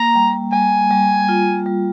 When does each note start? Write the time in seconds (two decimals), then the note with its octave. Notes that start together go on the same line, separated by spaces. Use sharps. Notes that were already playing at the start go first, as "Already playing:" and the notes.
Already playing: A#3 A#5
0.15 G3
0.53 G3 G#5
0.91 G3
1.29 F4
1.66 G3